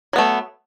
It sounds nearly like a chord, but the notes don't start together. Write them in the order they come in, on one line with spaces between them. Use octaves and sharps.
F#3 B3 A3